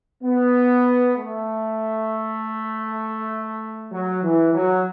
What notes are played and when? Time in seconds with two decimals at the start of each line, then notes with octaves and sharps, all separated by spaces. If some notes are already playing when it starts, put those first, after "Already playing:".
0.23 B3
1.16 A3
3.92 F#3
4.23 E3
4.54 F#3